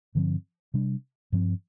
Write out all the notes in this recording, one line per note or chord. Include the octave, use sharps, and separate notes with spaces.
G2 D3 F3 C4
C3 G3 D4
G2 F3 C4